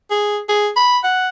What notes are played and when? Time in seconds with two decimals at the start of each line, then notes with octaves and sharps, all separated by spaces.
0.11 G#4
0.49 G#4
0.76 B5
1.04 F#5